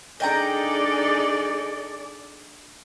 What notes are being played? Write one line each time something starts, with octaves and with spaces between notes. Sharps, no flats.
D4 D#4 G#4 A4 D5 D#5 G5 A#5